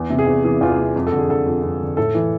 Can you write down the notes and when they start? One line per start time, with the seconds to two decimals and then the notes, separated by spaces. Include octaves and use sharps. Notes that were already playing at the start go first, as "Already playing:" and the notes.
Already playing: E2
0.10 C3
0.19 G#4
0.26 E2
0.44 E3 G#4
0.61 E2 F4
0.70 G#4
0.78 C3
0.96 F2
1.07 A4
1.13 D3
1.18 G#4
1.29 D3 A4
1.46 F2
1.63 F2
1.81 D3
1.97 A2 A4
2.15 E3